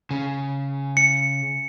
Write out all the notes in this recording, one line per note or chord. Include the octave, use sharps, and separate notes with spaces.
C#3
C#7